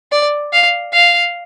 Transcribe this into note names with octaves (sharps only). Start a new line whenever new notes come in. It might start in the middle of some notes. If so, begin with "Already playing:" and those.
D5
F5
F5